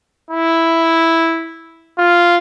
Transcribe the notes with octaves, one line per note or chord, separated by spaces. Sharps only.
E4
F4